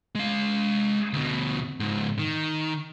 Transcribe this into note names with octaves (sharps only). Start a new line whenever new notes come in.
G#3 F5
D2 B2
C#2 G#2
D#3